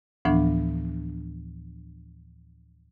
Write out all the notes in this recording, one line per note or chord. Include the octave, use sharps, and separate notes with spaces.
D2 A2 E3 F3 B3 D4